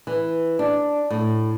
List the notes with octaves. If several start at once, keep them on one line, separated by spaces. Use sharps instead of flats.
E3
D4
A2